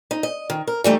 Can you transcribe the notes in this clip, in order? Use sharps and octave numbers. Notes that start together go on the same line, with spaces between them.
D#4
D#5
D#3
A#4
E3 G3 A3 D#4